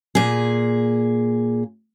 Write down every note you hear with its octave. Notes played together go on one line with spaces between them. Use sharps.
A#2 G#4